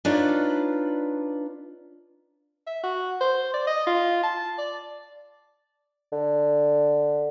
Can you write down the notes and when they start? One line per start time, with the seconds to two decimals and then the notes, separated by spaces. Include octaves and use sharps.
0.05 D4 D#4 F4 B4 C#5 D5
2.67 E5
2.83 F#4
3.21 C5
3.54 D5
3.67 D#5
3.87 F4
4.23 A5
4.58 D5
6.12 D3